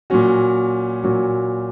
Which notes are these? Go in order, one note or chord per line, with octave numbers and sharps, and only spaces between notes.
A#2 F#3 C#4 F#4
A#2 F#3 C#4 F#4